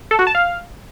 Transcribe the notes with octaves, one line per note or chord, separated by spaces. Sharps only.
A4
F#4
A5
F5